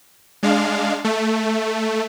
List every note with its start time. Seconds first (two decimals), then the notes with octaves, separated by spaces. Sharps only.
0.43 G#3 D4 F5
1.04 A3